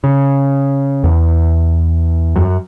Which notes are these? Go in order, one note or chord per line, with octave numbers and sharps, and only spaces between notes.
C#3
E2
F#2